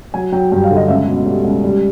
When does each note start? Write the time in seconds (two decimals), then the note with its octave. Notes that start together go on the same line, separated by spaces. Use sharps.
0.14 F#3 G#5
0.32 F#3 G5
0.52 G2 G5
0.64 F5
0.71 D3
0.76 D#5
0.88 C#2 E5
1.07 B2
1.26 G3
1.45 C#2
1.64 G3